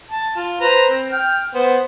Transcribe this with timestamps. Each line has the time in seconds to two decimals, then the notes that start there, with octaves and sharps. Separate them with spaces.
0.11 A5
0.36 F4
0.61 B4 C5 A#5
0.90 C4
1.12 G5 F6
1.54 B3 C5